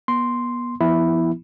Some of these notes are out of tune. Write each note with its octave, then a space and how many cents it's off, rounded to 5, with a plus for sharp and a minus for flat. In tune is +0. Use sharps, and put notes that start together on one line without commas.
B3 -35 C6 +0
F3 -45 B3 +0 E4 +0